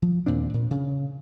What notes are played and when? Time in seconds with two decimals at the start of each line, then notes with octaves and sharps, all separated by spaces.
0.02 F3
0.26 D#2 A#2 C4 D4
0.54 A#2
0.71 C#3